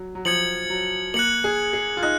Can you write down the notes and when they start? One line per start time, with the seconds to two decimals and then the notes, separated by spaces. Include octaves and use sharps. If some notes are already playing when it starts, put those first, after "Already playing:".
Already playing: F#3
0.15 F#3
0.25 F3 G#6 C#7 F#7
0.70 F#3
1.14 A#3 F#6 C#7 F#7
1.44 G#4
1.73 G#4
1.97 F4
2.03 D#4 F#6